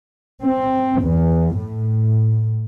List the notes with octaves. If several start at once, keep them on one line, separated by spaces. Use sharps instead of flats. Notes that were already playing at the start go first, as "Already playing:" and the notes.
C4
E2
A2